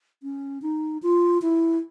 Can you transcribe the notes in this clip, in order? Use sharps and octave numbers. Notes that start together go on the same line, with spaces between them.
C#4
D#4
F4
E4